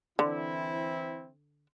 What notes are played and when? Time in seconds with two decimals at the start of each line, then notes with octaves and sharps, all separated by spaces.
0.19 D3 E3 C4 E4